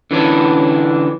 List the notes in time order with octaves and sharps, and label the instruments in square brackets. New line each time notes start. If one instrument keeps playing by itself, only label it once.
[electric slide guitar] D3 E3 C#4 D4